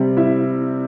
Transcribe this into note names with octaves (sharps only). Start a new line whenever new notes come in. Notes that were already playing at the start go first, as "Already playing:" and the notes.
Already playing: C3 G3 C4
E4 E5